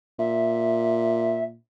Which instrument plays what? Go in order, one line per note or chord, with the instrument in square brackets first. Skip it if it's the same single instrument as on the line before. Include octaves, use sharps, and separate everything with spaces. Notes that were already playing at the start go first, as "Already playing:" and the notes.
[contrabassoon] A#2 [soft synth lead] E5